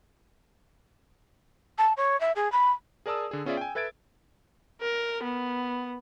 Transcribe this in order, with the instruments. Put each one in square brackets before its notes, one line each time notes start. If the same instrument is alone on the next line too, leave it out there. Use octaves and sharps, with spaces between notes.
[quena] A5
C#5
E5
G#4
B5
[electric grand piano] G#4 A#4 D5 A5 D#6 E6
D3 G#4
B3 C#4 F4 G#4 D5 E5
G5 G#5
A4 B4 E5 G#6 A6 D7
[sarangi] A#4
B3